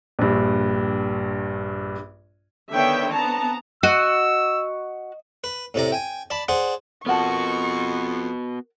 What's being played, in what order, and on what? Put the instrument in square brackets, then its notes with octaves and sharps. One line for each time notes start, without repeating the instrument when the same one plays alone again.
[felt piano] A#1 G2
[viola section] D3 D#3 B3 C#5 E5 G5
B3 C4 A5 A#5
[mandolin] F#4 [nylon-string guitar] D#5 [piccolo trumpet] E6
[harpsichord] B4
A2 C3 D5 A#5
G5 G#5
D5 A5 B5
G#4 C5 D5 F#5
[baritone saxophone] F2 [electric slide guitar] B3 F#4 [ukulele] A#4 F#5 A5 [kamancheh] C#6